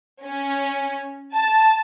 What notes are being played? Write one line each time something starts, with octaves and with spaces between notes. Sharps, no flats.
C#4
A5